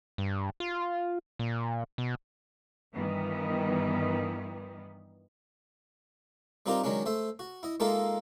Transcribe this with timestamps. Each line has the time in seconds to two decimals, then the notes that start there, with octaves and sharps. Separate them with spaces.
0.18 G2
0.60 F4
1.39 A#2
1.98 B2
2.93 G2 D#3 E3 G3 B3
6.66 G3 C4 D#4 F4 G4 A#4
6.84 D#3 F#3 G#3 C#4 D4
7.06 A3 C5 E5
7.39 F#4
7.63 E4 D#5
7.80 G#3 A#3 D#4 F4 A4 E5